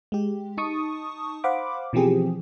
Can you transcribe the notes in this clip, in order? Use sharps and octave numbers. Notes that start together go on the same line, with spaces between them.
G#3 G4
D#4 A5 C#6 D#6
C5 F5 F#5 B5 D6
B2 E3 F3 C4 G4 G#4